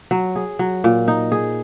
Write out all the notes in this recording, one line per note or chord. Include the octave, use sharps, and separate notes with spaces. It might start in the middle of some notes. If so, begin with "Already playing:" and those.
F#3
G#4
F#3
A#2
D#4
G#4